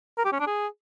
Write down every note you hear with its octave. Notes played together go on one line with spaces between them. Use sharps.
A#4
G4
C#4
D4
G#4